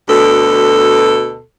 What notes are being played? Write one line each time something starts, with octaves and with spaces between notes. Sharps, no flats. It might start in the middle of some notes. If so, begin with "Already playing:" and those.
D2 B2 A4